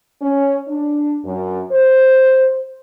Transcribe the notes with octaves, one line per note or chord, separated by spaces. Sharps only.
C#4
D4
F#2
C5